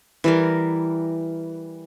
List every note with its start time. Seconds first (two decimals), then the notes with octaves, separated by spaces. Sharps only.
0.24 E3 G3 A#4